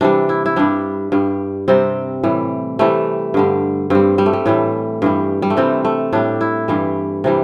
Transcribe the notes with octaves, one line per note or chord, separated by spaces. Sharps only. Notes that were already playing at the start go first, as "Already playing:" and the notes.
C3 E3 G3 D4
E4
E4
G2 G3 D4
G2 G3
C3 G3 C4
A2 E3 G3
C3 E3 G3 A3
G2 D3 G3
G2 G3 C4
G3
A3
G3
A2 E3 G3
G2 E3 G3
G3
A3
C3 E3 G3 C4
A3
A2 G3 D4
E4
G2 E3 G3
C3 E3 G3